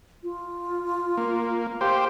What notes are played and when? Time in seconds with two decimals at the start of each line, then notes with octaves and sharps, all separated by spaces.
0.23 F4
1.17 A#3
1.81 G4 C5 F5